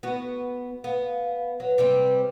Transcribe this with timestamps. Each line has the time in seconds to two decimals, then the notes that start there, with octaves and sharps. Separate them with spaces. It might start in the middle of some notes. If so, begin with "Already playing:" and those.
0.03 B3 F#4
0.84 B3 F5
1.60 F#3 B4
1.78 C3 G3 C4